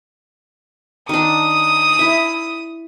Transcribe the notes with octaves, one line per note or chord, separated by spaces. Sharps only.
D#3 D4 D#6
E4 E5